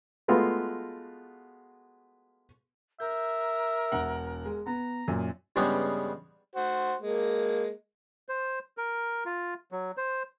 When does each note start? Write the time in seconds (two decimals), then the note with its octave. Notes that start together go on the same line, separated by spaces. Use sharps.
0.28 G#3 A3 B3 F4 F#4 F5
3.00 A#4 E5 G6
3.92 E1 F#5
4.46 G#3
4.67 B3 A#5
5.08 F#2 A#2 F#3
5.56 G2 C#3 G3 G#3 B3 C#4
6.55 F#4 C5
7.00 G#3 A#3
8.29 C5
8.77 A#4
9.25 F4
9.72 F#3
9.97 C5